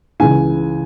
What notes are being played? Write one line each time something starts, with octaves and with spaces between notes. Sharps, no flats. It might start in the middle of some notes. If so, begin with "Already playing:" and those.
C#2 C#3 E3 G#5